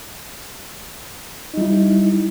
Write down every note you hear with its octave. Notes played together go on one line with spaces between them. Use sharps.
G3 D#4 E4